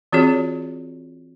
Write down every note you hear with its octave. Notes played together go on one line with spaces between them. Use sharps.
E3 C4 F4 F#4 G#4 C#5